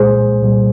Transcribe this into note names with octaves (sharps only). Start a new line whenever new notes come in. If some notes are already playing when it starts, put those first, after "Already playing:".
Already playing: C2 A#2 G#3 G#4 C5
C2 A#2 G3